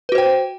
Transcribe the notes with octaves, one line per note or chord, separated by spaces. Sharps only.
F#4 B4 C5 G5